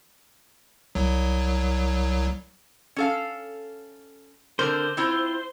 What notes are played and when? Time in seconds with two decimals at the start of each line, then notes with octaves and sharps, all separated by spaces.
0.95 C2 F#3
2.96 C#4 A4 F5
4.59 D3 C4 A#4 C5
4.97 C4 E4 F4